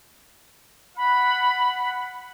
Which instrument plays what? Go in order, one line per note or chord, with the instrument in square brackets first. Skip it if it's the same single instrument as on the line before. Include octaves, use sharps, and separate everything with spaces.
[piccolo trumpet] F#5 [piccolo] B5